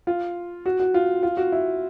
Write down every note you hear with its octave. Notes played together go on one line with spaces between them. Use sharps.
F4
F#4
F#4
F4
F4
F#4
E4